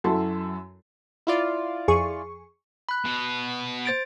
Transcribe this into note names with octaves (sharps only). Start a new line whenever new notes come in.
F#2 E4 F#4 A4 A5 C6
E4 F4 D5
F2 G#4 C#6
B5 F#6
B2 B3
C5 A6 D7